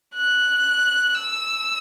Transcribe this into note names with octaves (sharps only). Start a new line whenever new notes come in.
F#6
E6